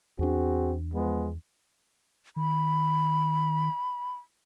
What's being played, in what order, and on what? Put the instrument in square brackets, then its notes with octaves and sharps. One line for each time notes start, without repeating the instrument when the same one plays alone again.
[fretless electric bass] E2 D4 [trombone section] C4 F#4 G#4
[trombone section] F3 G#3 B3
[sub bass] D#3 [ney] B5